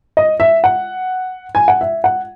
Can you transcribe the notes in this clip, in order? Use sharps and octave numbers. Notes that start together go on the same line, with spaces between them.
D#5
E5
F#5
G#5
F#5
E5
F#5